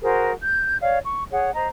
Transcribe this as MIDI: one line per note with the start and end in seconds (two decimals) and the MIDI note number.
0.01 0.32 66
0.01 0.32 68
0.01 0.32 70
0.01 0.32 72
0.41 0.77 91
0.81 0.97 73
0.81 0.97 74
0.81 0.97 77
1.05 1.24 85
1.30 1.53 68
1.30 1.53 73
1.30 1.53 78
1.54 1.68 72
1.54 1.68 75
1.54 1.68 82